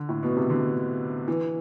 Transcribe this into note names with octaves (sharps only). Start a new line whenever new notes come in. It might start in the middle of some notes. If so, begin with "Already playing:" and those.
Already playing: D3
A2
B2
C3
D3
E3